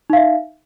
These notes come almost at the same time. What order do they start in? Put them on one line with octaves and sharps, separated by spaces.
D#4 F5 E5